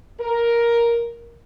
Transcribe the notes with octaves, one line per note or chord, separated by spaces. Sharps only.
A#4